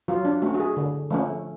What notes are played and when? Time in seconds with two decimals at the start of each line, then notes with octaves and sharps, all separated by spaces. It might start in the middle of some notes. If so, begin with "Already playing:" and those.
0.08 F#3 F4
0.25 D4
0.42 A3 C#4 F#4
0.54 F#4
0.60 G#4
0.77 D3
1.10 F3 A3 C#4